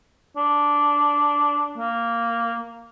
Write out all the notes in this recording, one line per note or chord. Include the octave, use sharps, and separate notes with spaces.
D4
A#3